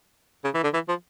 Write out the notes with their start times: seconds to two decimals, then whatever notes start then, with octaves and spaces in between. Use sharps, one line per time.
0.44 C#3
0.54 E3
0.64 D3
0.74 E3
0.89 F3